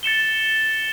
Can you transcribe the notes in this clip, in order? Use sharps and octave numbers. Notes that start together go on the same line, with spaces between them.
A6 C#7 E7 G7